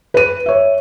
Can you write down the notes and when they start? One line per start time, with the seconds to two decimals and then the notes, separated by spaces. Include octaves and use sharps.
0.14 B4 D#7
0.46 C#5 E5